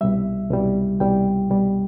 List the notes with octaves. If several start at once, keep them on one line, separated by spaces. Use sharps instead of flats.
C2 B2 G3 E5
C2 B2 G3
C2 B2 G3 G5
C2 B2 G3